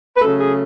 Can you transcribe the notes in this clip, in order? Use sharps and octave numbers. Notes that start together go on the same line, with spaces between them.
B4
C#3 F#3 A3 C#4 A4
G#4